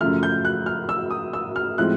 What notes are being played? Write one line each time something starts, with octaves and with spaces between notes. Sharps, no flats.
F#2 C#3 F3 A3 F6
G6
F#6
F6
E6
D#6
E6
F6
A2 F3 G#3 C4 F#6